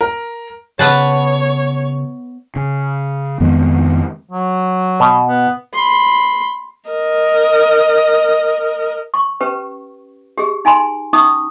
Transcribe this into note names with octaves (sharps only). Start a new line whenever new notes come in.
A#4
C#3 B3 B4 C#5 A5
C#3
F2 D#3 G#3 B3
F#3
B2
B3
B5 C6
A#4 D#5
C#6
C#4 G4 B4
G4 G#4
D#4 G#5 B5 C6
C#4 D#4 C#6 D#6